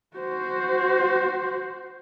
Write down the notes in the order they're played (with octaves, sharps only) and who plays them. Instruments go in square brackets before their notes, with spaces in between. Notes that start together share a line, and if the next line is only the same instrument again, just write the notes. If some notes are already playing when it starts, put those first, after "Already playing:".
[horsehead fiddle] F#4 C5